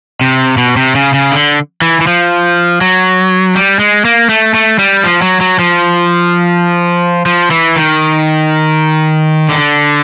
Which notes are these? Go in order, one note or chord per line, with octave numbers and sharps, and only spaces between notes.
C3
B2
C3
C#3
C#3
D3
E3
E3
F3
F#3
G3
G#3
A#3
A3
A3
G3
F3
F#3
F#3
F3
F3
E3
D#3
D3